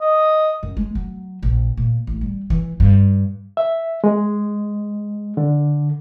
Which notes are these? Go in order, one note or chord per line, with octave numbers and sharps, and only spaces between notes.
D#5
F#2
G#3
F#3
A#1
A#2
A1
G3
E3
G2
E5
G#3
D3